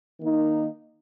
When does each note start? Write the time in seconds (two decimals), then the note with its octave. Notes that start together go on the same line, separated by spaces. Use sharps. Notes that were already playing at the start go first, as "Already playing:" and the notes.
0.20 D#3 A#3 D#4